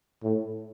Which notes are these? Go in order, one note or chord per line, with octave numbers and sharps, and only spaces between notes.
A2